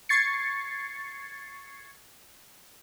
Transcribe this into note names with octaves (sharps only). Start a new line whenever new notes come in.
C#6 G#6 A6 C7 C#7